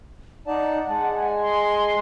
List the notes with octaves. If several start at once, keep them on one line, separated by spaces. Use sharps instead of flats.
D#4 D5 F#5 A5
G#3 A5
G#5
C6